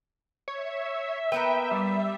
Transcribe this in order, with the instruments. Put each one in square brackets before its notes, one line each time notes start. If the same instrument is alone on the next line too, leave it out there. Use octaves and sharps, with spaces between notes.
[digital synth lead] C#5 [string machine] E5
[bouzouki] A#3 B3 B4 [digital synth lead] G5
[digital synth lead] G3